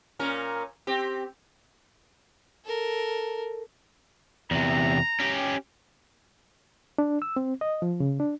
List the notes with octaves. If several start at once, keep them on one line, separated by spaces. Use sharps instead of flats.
A#2 C#4 A#4
C4 G4
A4 A#4
E2 C3 A#5
C#4 G4
D4
E6
C4
D#5
F3
C#3
D4